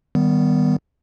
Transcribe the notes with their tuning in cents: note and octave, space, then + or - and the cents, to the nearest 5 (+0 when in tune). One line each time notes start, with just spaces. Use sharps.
D#3 +0 G3 -5 B3 +0